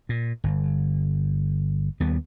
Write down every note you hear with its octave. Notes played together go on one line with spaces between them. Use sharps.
A#2
G1
D#2 G3 B3